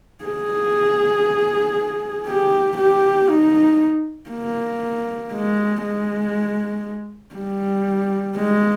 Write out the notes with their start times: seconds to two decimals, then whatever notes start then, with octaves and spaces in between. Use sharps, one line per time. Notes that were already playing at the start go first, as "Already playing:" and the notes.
0.24 G#4
2.27 G4
2.78 G4
3.29 D#4
4.30 A#3
5.31 G#3
5.83 G#3
7.35 G3
8.37 G#3